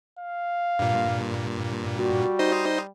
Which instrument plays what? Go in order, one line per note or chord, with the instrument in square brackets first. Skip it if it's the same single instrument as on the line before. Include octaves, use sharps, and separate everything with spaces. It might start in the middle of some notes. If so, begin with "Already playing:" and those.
[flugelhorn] F5
[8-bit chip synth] G2 A#2
[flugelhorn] G3 [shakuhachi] F#4
[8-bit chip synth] D#4 C5 D#5